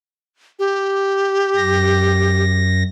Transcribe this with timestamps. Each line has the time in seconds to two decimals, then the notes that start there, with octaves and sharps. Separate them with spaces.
0.59 G4
1.56 F#2 A#6